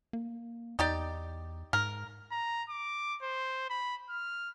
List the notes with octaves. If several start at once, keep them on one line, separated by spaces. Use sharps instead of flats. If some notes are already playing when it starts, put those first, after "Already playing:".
A#3
E2 D#4 G4 D5
G#2 A#4
A#5
D6
C5
B5
F6